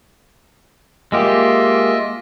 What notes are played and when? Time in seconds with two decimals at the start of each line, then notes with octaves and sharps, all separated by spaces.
1.12 G#3 A#3 F4 G4 D#5 E5